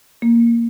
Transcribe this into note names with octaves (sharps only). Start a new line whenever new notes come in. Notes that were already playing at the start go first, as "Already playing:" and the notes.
A#3